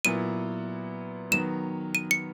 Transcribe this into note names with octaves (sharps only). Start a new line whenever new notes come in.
A#2 F#3 B3 E4 D#7
D#3 F#3 B3 E7
D#7
C#7